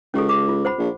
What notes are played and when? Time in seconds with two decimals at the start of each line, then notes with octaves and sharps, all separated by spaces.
0.14 C#2 C#4 G4 A4
0.29 D6
0.49 F4
0.65 C5 F#5 B5
0.79 A#1